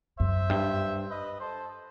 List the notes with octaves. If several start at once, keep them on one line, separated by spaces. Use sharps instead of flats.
F#2 C5 E5
G2
B4 D#5
A4 C5